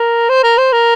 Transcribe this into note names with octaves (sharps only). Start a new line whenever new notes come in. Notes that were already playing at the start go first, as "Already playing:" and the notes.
Already playing: A#4
C5
A#4
C5
A#4